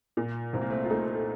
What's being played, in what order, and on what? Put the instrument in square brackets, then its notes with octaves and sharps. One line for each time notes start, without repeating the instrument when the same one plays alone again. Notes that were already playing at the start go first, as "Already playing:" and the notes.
[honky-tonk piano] A#2
[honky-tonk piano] C2 [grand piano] C4
[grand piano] A#3
A3 C4
F4
[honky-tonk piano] A3 [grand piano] C4 D#4